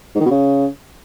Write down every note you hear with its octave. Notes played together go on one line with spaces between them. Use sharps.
G#2
D#3
B2
C#3